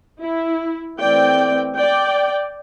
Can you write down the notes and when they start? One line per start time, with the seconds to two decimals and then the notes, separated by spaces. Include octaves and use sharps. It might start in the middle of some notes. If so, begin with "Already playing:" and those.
0.21 E4
0.99 E3 A3 C4 D5 G5
1.76 D5 G5